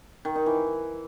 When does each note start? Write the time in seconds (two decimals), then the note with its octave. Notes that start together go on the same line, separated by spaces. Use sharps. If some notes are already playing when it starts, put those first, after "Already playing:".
0.25 D#3
0.36 D#4
0.46 E3